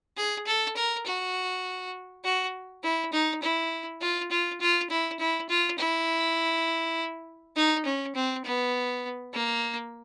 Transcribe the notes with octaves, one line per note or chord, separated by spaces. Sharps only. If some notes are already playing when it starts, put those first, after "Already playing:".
G#4
A4
A#4
F#4
F#4
E4
D#4
E4
F4
F4
F4
E4
E4
F4
E4
D#4
C#4
C4
B3
A#3